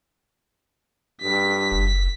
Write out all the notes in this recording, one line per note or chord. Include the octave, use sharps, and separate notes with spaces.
G2 B6
F#1